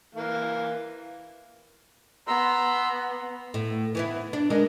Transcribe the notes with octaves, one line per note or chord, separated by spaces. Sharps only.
E3 A#3 F5
B3 A#5 C6 E6
A2
E3 B3 E4
D4
G#3 D4 A#4